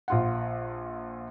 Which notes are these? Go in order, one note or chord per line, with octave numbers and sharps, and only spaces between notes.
A#1 F4 F#5